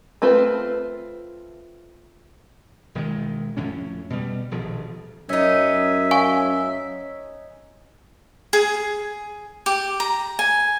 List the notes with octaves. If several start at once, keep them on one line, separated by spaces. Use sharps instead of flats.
A3 C4 F4 B4
E1 D#3 G#3
F2 A2 C#4
B2 G3
D#1 A#1 B2 F3
F#2 C#4 D#4 E5
F5 G#5 C#6
G#4
G4
A#5
G#5